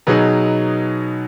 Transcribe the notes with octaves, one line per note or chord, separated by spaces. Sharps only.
B2 F#3 B3 D#4 G#4